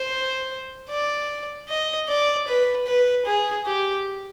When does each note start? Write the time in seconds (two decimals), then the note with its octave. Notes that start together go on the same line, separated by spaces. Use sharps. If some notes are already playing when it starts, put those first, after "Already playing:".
Already playing: C5
0.89 D5
1.69 D#5
2.08 D5
2.47 B4
2.86 B4
3.26 G#4
3.66 G4